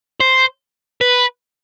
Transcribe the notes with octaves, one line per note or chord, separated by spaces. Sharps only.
C5
B4